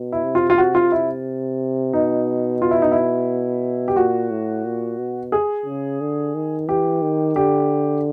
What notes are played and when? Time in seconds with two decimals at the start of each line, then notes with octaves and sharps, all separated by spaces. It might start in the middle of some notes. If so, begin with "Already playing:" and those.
Already playing: B2
0.12 E4
0.24 C3
0.35 F4
0.50 F4
0.58 C3 F#4
0.75 F4
0.92 E4
1.93 B2 D#4
2.62 F4
2.71 E4
2.82 D#4
2.92 E4
3.88 G4
3.96 A#2 F#4
4.30 A2
4.65 A#2
4.98 B2
5.32 G#4
5.66 C#3
6.01 D3
6.35 D#3
6.68 E3 G4
7.02 D#3
7.36 D3 G4